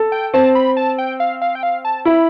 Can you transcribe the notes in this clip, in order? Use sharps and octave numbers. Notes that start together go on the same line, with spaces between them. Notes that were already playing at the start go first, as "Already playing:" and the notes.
Already playing: A4
G5
C4 A5
B5
A5
G5
F5
F5
G5
F5
A5
E4 B5